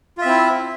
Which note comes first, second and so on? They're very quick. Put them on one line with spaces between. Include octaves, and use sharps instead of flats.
F4 E5 C4 E4